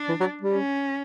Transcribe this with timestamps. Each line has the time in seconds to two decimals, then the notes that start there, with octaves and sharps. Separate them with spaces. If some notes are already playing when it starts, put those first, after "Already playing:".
Already playing: D4
0.09 E3
0.20 F#3
0.41 G3
0.53 C#4